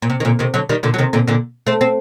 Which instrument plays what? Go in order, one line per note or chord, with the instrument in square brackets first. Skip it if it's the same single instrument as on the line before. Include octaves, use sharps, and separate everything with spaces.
[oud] A#2
C3
D#3
A#2 D3
C3 D#3
D3 F#3
D#3 G3
A#2 D3
F#3
C3 D#3
A#2 D3
A#2 D3
A3 C4
C4